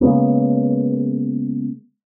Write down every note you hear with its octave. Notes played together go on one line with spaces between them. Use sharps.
C#3 G#3 A#3 B3